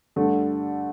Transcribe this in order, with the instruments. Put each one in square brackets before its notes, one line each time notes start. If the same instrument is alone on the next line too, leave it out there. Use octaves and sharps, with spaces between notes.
[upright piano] G2 D3 A3